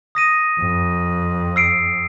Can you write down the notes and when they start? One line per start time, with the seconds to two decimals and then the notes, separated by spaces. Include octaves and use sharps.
0.15 D#6 A#6 D#7
0.61 F2
1.56 E6 C7 D7